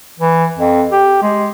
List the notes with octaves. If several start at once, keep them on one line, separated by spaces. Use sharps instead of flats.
E3
F2
G4
G#3